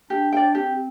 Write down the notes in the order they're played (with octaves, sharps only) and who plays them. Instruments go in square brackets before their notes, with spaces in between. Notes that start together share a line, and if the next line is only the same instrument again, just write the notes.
[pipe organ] D4 [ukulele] G4
[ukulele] D5 G5
[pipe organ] C4 [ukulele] G4